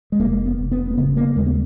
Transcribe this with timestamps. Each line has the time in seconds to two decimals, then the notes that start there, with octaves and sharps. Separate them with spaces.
0.12 G#3
0.20 F1 A#3
0.46 B3
0.59 F1
0.72 B3
0.91 A#3
0.98 C#3 B3
1.12 B3
1.17 A#3
1.36 D#2 G#3
1.46 B3